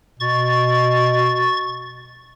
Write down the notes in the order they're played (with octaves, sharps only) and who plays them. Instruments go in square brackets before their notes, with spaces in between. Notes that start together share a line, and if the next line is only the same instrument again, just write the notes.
[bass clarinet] B2 [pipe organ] C#6 A6